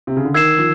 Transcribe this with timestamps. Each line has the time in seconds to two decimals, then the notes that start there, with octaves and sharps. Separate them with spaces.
0.07 C3
0.16 C#3
0.25 D3
0.34 D#3 E6 G#6 C7 E7
0.58 F3